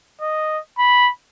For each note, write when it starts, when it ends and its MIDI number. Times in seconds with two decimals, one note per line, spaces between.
0.21 0.60 75
0.78 1.11 83